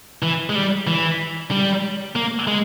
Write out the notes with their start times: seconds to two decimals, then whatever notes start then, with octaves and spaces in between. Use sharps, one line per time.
0.23 E3
0.50 G#3
0.55 G3
0.87 E3
1.51 G3
2.16 A#3
2.48 G#3